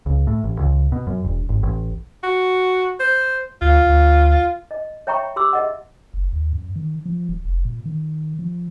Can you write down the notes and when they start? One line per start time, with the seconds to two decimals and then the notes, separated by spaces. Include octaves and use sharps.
0.06 C#2
0.27 A2
0.44 A1
0.59 C#2
0.92 B2
1.07 F#2
1.24 E1
1.49 G#1
1.63 A1
2.23 F#4
3.00 C5
3.62 D2 F4
3.86 D2
4.71 D#5
5.07 C#5 E5 G5 A#5 B5 C#6
5.36 G4 C6 D6 E6
5.53 G#4 D#5 E5 F#5
6.14 F#1
6.33 D#2
6.53 F#2
6.76 D#3
7.06 F3
7.29 D1
7.45 F1
7.65 A#2
7.86 D#3
8.39 F3